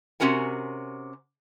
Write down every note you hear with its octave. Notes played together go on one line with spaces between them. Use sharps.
C3 C#4 F#4 A#4 G#5